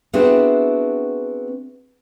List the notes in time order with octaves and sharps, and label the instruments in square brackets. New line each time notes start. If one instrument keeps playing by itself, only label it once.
[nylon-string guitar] B3 C4 D4 E4 F#4 G#4